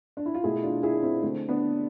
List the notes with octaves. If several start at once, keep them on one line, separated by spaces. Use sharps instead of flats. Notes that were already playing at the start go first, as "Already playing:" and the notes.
D4
E4
F4
B2 A3 E4 G#4
D4 F4
E4 G#4
C4 E4
D3 A3 C4
B3 D4